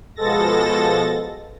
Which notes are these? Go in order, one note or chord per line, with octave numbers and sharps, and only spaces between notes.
B2 F3 G#3 A4 A6 A#6